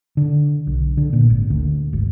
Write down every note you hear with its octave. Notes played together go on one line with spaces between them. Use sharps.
D3
B1
D3
A#2
G#1
D2
G#1